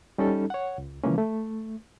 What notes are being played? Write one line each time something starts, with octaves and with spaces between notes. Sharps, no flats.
G3 C#4 D#4 A4
C#5 F#5
C#2
C#3 E3 F3 G#3 A#3 C#4
A3